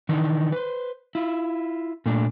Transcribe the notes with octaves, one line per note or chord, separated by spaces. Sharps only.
D#3 E3 D4 D#4
B4 C5
E4 F4
A#2 A3 D4